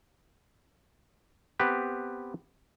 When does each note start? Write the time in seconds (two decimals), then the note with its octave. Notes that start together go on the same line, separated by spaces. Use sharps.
1.59 B3 C4 G4 B4